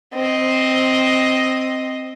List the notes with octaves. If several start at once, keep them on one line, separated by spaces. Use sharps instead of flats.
C4 D#5